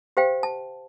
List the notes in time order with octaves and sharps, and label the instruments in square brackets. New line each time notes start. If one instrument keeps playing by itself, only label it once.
[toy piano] G4 C5 F5 G5
A5